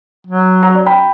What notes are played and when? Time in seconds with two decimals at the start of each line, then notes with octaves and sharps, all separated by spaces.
0.27 F#3
0.63 F#5 A#5
0.75 D5
0.86 G5 B5